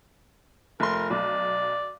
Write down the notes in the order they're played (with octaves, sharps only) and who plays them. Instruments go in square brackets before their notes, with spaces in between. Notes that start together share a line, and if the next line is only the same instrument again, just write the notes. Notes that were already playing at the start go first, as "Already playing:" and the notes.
[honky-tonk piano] F1 C6 [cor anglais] A#4
[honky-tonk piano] B1 [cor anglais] D5